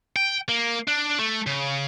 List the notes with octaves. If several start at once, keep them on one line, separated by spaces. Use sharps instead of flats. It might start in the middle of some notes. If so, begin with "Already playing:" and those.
G5
A#3
D4
A3
C#3